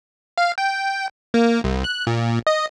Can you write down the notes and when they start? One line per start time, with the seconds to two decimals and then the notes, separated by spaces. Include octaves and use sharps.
0.38 F5
0.58 G5
1.34 A#3
1.64 C2
1.84 F#6
2.07 A#2
2.47 D#5